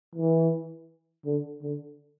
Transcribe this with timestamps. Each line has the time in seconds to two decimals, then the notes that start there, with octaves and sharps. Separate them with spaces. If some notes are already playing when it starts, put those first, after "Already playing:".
0.15 E3
1.26 D3
1.62 D3